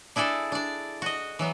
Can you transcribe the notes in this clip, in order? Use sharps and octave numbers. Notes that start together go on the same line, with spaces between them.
D4 E4 G#4 A4 D5
D4 D5
F#4 D#5
E3 F#3 B3